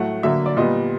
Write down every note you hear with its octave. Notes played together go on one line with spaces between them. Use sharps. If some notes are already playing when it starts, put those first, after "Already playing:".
Already playing: A2 F#3 A3 F#5
D3 F#3 A#3 E5
D5
A#2 G3 B3 D#5